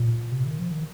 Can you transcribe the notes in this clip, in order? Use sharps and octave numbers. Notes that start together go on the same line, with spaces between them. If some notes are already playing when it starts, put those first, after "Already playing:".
Already playing: A#2
C3
D#3
F3
D#3